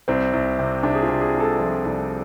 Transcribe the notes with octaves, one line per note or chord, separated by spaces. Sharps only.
C2 C4
C2
C3
C3 D4
G#4
F4
C3
G#4
C2
A4
F3
C2